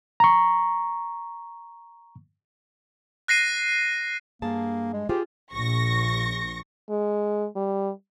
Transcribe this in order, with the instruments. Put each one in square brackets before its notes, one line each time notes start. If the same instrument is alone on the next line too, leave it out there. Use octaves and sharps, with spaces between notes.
[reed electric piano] A#5 C#6
[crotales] F#6 A#6 C7 D#7
[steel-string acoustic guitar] G2 G#4 A5 [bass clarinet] A#3
[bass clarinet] G#3
[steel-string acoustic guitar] F4 G#4 C5 [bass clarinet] G4
[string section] A#1 C#6 A#6
[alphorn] G#3
G3